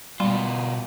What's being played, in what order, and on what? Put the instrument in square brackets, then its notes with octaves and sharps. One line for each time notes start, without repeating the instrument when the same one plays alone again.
[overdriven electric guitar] B2 F4 [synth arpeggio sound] G3